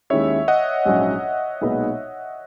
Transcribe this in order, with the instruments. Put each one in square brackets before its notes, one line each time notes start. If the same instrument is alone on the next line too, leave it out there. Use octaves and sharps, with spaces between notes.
[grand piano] D#2 D#3 G#3 C#4 E4 [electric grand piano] C#5 E5
[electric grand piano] D#5 F#5
[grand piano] A#1 G#2 F#3 C#4
B1 A#2 G#3 B3 D#4